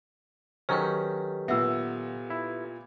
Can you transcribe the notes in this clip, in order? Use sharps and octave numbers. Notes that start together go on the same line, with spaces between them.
D#3 F#3 C#4 G4 A4 B4 C5
A#2 B3 E5 F#5 E6
E4